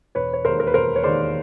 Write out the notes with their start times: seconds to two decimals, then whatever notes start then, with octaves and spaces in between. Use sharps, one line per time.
0.15 E1 B4 C#5
0.33 C#5
0.45 D#2 D#3 G#3 A#4 C5
0.60 A#4
0.67 B4
0.74 E1 A#4 C5
0.96 C#5
1.04 D#2 D#3 G#3 C5 D5